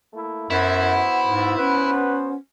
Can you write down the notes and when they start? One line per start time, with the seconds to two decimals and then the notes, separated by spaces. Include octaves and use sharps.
0.13 A3 A#3 E4
0.50 F#2 B3 E4 F#4 C5 F#5
1.26 G#2
1.58 C#4 B4